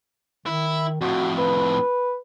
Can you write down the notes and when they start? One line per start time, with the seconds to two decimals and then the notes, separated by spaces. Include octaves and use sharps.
0.46 D#3 E4
1.01 F2 A2 F#4
1.38 B4